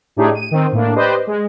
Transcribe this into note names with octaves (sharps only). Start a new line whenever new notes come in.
A2 A3 D4 D#4 G4 G#4
D#7
D#3 C4
A2 A#3 D4
G4 B4 C5 D5 D#5
G#3